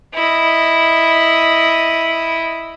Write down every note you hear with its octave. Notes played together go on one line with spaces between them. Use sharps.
E4 D#5